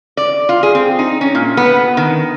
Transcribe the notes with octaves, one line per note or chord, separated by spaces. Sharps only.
D5
F4
G#4
C4
D#4
C#4
A#2
B3
D#3